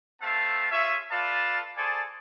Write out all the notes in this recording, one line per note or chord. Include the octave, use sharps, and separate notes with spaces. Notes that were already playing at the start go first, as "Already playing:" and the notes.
A3 B3 C4 F5 A5
F4 G#4 C#5 E5
F4 A4 B4 D5 F5 A5
G#4 A4 C5 D5 G#5 A5